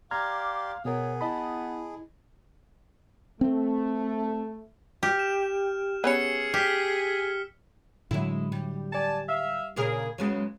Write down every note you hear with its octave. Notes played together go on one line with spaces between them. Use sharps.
G4 D5 F5 A#5 C6 D6 F6 G#6
B2 B3 G#4 A#4 C#5
E4 D#5 A5 B5
A3 C4
G4 F6 D7
E7
B3 C#4 G#4 C#5 E6 C#7
G4 F6 B6 G7
A2 D3 F#3 G#3 E4
G3
D5 G#5 A5
E5 F5
A#2 C#3 G#4 A#4
C#3 F#3 G#3 B3